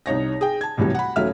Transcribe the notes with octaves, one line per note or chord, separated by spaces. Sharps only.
C2 D#4 C#5 A#6
G#4 G5
A5 G#6
C2 A2 E3 F#3 G3
F#5 B5
D#1 F#3 A3 C#4 E5 F6